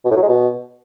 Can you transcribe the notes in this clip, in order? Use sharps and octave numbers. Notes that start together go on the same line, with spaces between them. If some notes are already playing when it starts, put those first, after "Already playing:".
B2
A2
F#3
G#3
B2